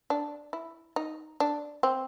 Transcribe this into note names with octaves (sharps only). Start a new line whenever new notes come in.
D4
E4
D#4
D4
C4